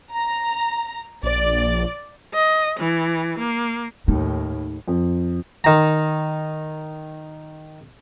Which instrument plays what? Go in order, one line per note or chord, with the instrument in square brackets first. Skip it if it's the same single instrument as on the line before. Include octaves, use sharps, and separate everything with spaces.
[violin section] A#5
[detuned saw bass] A#1 [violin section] D5
[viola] D#5
E3
A#3
[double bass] D#2 A2 [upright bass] D#4
[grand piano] F2
[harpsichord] D#3 A#5